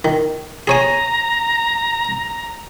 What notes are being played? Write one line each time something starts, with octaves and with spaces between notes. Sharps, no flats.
D#3
G#4 C#5 G#5 A#5